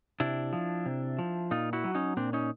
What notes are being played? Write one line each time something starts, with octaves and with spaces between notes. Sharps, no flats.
C3 D4 E4
F3
C3
F3
A#2 D#4 F4
E4 F#4
F#3
C#4 D#4
A#2 C4 D4
C#4 D#4